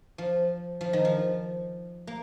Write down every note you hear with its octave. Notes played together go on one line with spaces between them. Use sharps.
F3
F3
D#3
F3
A#3